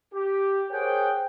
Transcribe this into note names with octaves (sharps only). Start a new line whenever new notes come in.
G4
G#4 A#4 C5 C#5 F#5 G5